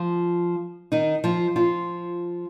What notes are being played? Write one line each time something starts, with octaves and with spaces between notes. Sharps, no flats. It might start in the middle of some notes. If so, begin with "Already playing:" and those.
Already playing: F3 F4
D#3 D#4
F3 F4
F3 F4